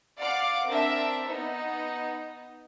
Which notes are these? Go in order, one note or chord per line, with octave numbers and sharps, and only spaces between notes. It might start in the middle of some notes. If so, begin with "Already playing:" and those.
D5 F5 F#5 D6
C4 D4 A#4 E5
B3 D#4